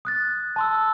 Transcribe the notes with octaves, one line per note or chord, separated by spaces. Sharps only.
D#6 F#6 A6
A5 C6 E6